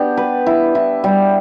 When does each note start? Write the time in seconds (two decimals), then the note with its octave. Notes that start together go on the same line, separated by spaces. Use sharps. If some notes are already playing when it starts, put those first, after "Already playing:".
Already playing: B3 D4 G4
0.17 B4
0.46 E4
0.75 E4
1.04 G3